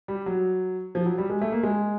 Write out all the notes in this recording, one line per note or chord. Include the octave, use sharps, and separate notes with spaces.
G3
F#3
F3
F#3
G3
G#3
A3
A#3
G#3